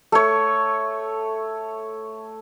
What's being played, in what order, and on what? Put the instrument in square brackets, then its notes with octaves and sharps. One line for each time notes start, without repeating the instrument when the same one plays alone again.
[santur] A3 C#5